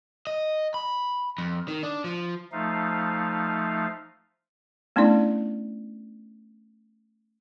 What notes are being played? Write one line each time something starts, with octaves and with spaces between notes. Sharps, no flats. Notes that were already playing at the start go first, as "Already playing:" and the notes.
D#5
B5
F2
D#3
D4
F3
F3 A3 D#4 F5
A3 B3 C#4 D4 E4 D5